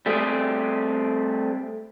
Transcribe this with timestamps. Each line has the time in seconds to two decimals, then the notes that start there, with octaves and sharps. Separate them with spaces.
0.06 G3 A3 C4 G4 G#4